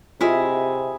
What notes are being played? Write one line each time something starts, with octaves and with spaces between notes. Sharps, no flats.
C3 E4 F4 G#4 D#5